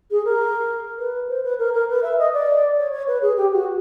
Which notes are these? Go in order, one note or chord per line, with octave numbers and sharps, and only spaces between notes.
G#4
A#4
B4
C5
B4
A#4
A#4
B4
E5
D#5
D5
C#5
C#5
B4
G#4
G4
F#4